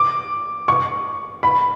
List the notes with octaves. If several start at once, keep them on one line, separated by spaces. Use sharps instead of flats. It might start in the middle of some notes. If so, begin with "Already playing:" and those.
Already playing: D6
C#6
B5